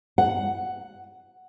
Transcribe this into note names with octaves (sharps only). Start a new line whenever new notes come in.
F#5